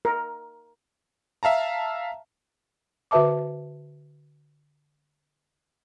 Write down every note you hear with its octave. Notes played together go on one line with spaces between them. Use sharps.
A#4
E5 F5 A5 A#5
D3 F#4 B4 E5 A5 D6